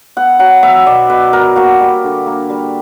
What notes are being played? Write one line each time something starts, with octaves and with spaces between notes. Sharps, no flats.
B3 F#5
F#3 F#5
B3 E5
B2 D5
B2 B4
B3 A#4
A#3 F#4
G3
D3
A#3
G3